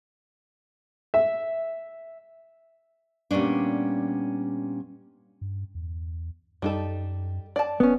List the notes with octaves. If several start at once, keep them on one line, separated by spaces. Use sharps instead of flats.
E5
A#2 G3 B3 C#4 D4
G2
E2
F#2 G3 D#4 A4
D5 A5
D1 B3 C#4